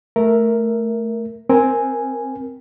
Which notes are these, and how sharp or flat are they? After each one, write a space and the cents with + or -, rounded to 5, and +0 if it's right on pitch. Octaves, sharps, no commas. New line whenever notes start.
A3 +0 A#4 +0 E5 +0
C4 +0 A#4 +10 G#5 +0